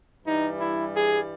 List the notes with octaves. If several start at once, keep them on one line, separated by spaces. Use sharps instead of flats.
G2 E3 G3 D#4
E4
G#4